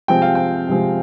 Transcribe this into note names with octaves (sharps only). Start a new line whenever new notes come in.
C3 F3 G#3 C4 G5
F5
G5
C3 F3 G#3 C4